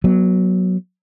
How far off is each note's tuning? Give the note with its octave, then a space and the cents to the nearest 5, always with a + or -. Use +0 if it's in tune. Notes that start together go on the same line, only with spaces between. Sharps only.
F#3 +0 B3 -35